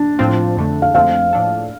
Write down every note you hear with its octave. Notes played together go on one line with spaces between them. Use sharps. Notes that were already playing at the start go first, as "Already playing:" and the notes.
Already playing: D4
A2 F3 C4 F4
F2 D3 A3
F5
F2 D3 F3 A3 C4 F5
A2 F3 D4 A4